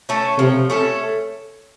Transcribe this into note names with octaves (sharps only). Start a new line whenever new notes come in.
A3 C#4 A4
C3 F3
A3 C#4 A4